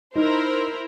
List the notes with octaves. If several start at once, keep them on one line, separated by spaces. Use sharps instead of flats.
D#4 E4 A#4 C5